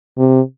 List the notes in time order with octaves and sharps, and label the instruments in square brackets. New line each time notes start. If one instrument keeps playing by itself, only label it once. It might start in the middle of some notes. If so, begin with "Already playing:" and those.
[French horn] C3